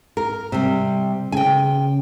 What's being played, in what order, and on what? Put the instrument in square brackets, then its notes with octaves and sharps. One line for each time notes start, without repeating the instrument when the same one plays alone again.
[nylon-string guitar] A#4
C3 G3
[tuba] C#3 [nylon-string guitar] G5 G#5